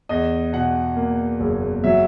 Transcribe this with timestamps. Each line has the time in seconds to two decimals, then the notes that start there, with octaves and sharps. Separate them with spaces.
0.09 E2 D#5
0.52 B2 F#5
0.96 A#3
1.40 F#1
1.84 F#3 E5